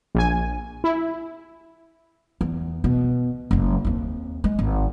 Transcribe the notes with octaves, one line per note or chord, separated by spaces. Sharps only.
A#1 G#5
E4
E2
B2
F#1 G#3
D#2 C4
G#3
G#1